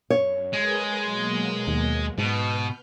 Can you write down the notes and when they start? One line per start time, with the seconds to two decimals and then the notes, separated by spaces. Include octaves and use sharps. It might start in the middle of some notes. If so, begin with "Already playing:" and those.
0.10 F#2 C#5
0.53 G#3 G#4 A#4 B4
1.03 B2 F#3 A#3
1.68 D#2
2.18 G#2 B2 B4 F6 G6